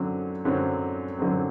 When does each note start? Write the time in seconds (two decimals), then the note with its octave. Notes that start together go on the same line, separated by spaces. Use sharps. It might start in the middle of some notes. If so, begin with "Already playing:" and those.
Already playing: F#2 D3 F#3 C4
0.45 F#2 D3 F#3 C4
1.19 F#2 D3 F#3 C4